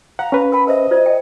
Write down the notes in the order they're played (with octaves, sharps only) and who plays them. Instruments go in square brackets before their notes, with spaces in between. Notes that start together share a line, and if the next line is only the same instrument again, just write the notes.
[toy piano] F5 [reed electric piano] F#5 [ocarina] A#5
[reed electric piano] C#4 B4
[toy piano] A#4 G5 A5 [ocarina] B5
[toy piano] A#4 C5 E5 [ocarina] D#5
[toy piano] F4 C5 D5
G5